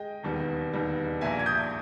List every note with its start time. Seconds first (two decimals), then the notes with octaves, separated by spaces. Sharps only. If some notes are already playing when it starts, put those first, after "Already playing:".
Already playing: G#3 D#5 G5
0.23 E1 D#2 D#3 G3 B3
0.72 E1 D#2 D#3 G3 B3
1.21 A#1 A#2 A#3 E5 G#5
1.39 G#6
1.46 D#6 G6